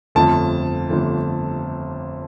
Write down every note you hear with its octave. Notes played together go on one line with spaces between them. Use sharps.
G1 F2 F3 A3 A5
G1 F2 F3 A3